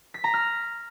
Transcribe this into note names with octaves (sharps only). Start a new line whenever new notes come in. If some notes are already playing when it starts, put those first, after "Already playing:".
B6
A#5
F6